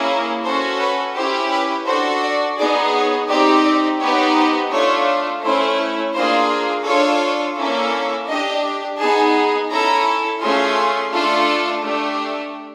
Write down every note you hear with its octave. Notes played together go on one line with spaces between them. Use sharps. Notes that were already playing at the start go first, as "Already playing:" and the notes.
Already playing: A#3 C#4 E4 G#4
C#4 F#4 A4 C5
B4
C#4 E4 G4 C5
B4
D4 F#4 A4 C5
D5
B3 D#4 G#4 D5
C#5
C4 D#4 G4 D5
D5
B3 D#4 G4 C#5
C5
A3 D4 F4 C#5
A3 C#4 E4 C5
A#3 D4 F4 G#4 C5
D4 F4 A4 C#5
A#3 C#4 E4 A4
D4 G4 D#5
B3 D#4 G#4 A5
C#4 E4 A4 A#5
A3 C#4 F4 G#4 C6
A3 D4 F4 A4
A3 D4 G4